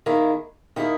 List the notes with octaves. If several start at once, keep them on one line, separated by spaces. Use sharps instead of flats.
D#3 A#3 E4 G#4
D#3 A#3 E4 G#4